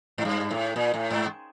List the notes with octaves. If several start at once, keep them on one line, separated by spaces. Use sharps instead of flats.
G#2
G2
A2
A#2
A2
G#2